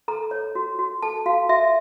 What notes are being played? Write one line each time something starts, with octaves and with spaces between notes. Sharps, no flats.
A4 A#5
C#5
F#4
F#4
A4 A5
F#4 F5
F#4 E5